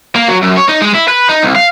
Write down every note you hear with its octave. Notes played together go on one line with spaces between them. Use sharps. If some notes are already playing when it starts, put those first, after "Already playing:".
A#3
F#3
F#2
C#5
D#4
G#3
E4
B4
D#4
C2
F5